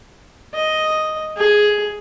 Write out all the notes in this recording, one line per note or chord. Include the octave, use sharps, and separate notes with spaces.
D#5
G#4